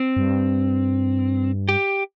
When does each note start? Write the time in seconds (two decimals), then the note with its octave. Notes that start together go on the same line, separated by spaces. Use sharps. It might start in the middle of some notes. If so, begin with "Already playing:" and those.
Already playing: C4
0.17 G2
1.69 G4